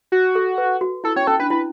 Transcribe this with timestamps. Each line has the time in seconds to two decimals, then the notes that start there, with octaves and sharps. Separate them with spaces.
0.12 F#4
0.35 A4
0.58 B4
0.81 F#4
1.04 E4 A4
1.16 C#4 C#5
1.27 C#4 A4
1.40 D4 B4
1.50 E4 B4